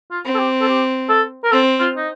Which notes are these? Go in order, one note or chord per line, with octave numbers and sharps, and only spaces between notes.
F4
C4
A4
G4
A4
G4
A4
A#4
C4 A4
F4
D#4